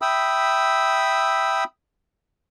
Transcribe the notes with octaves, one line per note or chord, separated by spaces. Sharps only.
E5 G5 B5 D#6 E6